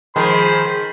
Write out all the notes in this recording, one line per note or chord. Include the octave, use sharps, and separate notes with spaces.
D#3 F3 G#3 C5 B5